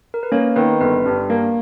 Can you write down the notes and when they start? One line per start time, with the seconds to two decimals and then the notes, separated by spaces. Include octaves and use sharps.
0.14 A#4
0.23 B4
0.32 A#3 C#4 C#5
0.56 D#3 B3 B4
0.80 G1 B3 B4
1.05 G2
1.30 A#3